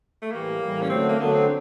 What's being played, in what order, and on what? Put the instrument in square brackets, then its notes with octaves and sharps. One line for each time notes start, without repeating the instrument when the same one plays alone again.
[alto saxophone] A3
[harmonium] A2 E3 G3 [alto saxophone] A#3
[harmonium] A2 E3 G3
[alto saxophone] C#4
[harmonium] D3 F#3 A3 D4 [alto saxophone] C4
[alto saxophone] A#3
[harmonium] D3 F#3 A3 D4 [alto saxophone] B3
[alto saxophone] C4